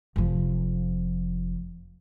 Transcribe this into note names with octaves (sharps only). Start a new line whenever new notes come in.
F1 F3